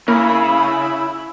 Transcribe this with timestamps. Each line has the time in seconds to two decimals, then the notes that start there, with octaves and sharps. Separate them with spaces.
0.08 C#3 A#3 C#4 E4 A#4 B5